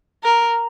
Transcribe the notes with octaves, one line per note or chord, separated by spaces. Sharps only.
A#4